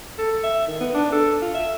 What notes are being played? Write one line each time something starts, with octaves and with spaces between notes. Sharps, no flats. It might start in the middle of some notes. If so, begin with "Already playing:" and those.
A4
E5
D#3
B3
D4
A4
F4
E5